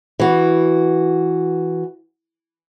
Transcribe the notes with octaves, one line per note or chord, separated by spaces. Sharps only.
E3 F#4